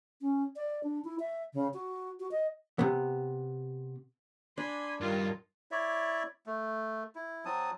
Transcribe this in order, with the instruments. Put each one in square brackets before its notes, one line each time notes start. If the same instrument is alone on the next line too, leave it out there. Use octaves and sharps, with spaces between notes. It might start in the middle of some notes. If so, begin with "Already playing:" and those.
[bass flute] C#4
D5
D4
E4
E5
C#3
F#4
F#4
D#5
[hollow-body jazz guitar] C3 B3
[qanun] D4 [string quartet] G#5 B5 [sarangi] C6
[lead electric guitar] G2 [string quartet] D#3 F#3 G3 [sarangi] F4
[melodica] E4 C#5 D5 E5
A3
E4
F#3 C4 A5 D#6